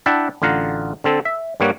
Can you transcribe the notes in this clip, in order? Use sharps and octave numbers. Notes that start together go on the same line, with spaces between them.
D4 E4 E5 F#5 G5 A5
A1 D3 F4 F5 F#5 A#5
D3 C4 A4
E5
G2 G3 A#3 C#5 F#5